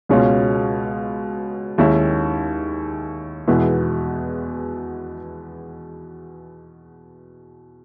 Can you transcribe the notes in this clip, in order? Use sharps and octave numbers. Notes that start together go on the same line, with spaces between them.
C#2 B2 G#3 C#4 F4
D#2 D#3 G#3 C#4 E4
E2 B2 G#3 B3 E4